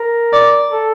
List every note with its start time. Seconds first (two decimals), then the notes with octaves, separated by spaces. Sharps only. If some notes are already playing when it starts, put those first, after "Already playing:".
Already playing: A#4
0.33 D5
0.72 A4